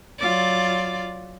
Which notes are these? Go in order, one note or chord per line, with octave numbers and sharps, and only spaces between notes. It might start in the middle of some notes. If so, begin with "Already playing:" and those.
F#3 F4 D5